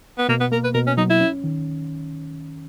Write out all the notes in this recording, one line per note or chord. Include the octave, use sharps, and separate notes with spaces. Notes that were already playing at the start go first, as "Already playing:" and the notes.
B3
B2 A#3
B3
A#3 A#4
B4
B2 A#4
C#4
F#3 D#4
E4
C#4
D#3